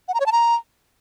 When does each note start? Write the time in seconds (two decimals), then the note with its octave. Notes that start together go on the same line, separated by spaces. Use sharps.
0.08 F#5
0.14 A#5
0.20 C#5
0.26 A5
0.32 A#5